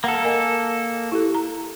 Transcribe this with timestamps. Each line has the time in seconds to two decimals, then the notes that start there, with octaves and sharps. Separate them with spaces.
0.04 A#3 A4 F#5
0.25 A#4 D#5 G#5
1.12 E4 G4 A4
1.34 A#5